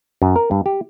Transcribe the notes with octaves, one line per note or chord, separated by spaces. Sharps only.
F#2
A#4
G2
G4